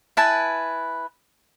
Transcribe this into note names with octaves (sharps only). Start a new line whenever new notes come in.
E4 B4 G#5 A5